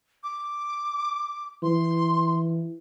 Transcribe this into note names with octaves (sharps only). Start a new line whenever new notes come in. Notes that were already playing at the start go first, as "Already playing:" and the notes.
D6
E3 C6